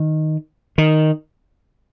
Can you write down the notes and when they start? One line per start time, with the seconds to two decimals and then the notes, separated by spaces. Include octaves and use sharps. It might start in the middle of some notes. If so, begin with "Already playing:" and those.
Already playing: D#3
0.78 D#3